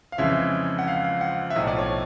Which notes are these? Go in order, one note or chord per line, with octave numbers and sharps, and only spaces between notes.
F5
F2 C#3 E3 G#3 E5
F#5
F5
F5
F#5
E5
B1 A2 F3 D#5
D5
C#5